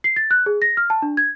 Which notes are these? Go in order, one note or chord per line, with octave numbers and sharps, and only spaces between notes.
C7
A6
F#6
G#4
A#6
F6
A5
D4
G#6